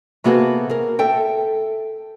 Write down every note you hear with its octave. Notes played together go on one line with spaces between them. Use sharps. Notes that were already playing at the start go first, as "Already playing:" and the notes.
C3 A#3 B3 F#4 G#4 A4
G#4 A#4
A4 E5 G5